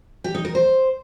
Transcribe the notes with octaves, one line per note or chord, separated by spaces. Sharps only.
G4
D#4
A#4
C5